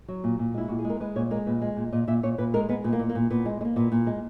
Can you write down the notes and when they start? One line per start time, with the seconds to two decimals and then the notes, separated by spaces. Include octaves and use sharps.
0.08 F#3
0.24 A#2
0.39 A#2
0.54 G#3 E4
0.68 A#2 F#4
0.79 G#4
0.85 G#3
0.90 A#4
1.00 G#3 B4
1.16 A#2 C#5
1.31 G#3 A#4
1.46 A#2 B4
1.62 G#3
1.77 A#2
1.93 A#2 D#5
2.08 A#2 E5
2.23 A#2 C#5
2.38 A#2 B4
2.54 G#3 A#4
2.69 G#3 B3
2.84 A#2 B3
2.93 A#3
2.99 A#2
3.09 A#3
3.15 A#2
3.30 A#2 B3
3.46 G#3
3.61 G#3
3.65 A#3
3.76 A#2 B3
3.92 A#2
4.07 G#3